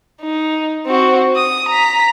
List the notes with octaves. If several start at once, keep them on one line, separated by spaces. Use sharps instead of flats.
D#4
C4 F#4
D#6
A#5 B6